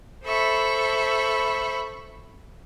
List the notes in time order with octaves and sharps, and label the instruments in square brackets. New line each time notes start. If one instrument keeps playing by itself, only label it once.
[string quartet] A4 C5 E5 B5 C#6